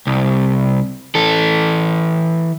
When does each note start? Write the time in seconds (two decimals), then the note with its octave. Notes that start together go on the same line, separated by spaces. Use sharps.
0.07 C2
1.15 E3 A4